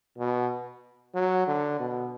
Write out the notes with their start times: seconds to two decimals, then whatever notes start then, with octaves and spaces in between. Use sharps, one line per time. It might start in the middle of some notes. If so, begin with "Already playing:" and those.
0.18 B2
1.15 F#3
1.47 D3
1.80 B2